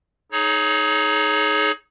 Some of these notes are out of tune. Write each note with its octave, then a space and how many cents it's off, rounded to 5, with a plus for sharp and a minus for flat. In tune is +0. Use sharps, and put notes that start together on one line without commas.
D#4 +0 G#4 +30 C#5 +0